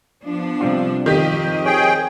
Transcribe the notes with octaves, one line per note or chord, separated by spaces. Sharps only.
F3 B3 D4
C3 G3 F4
F2 D#3 G4 D#5 B6
G#4 C#5 G5